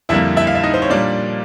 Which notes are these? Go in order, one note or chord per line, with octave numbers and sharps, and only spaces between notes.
F2 D3 G3 A#3 E4 E5
E4 E5
F5
E5
D#4 D#5
C5
C#5
A#2 G3 A#3 D4 D5